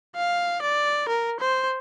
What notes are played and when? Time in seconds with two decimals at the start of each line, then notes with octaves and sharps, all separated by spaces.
0.16 F5
0.62 D5
1.09 A#4
1.40 C5